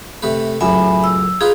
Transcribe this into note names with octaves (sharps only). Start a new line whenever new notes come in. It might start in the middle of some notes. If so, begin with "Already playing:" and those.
C3 A3 B4
C#2 F#2 A2 E5 G#5 B5
E6
D#4 F4 G#4 B4